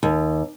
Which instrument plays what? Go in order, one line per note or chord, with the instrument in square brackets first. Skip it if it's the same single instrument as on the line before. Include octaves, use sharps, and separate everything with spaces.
[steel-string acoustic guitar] D#2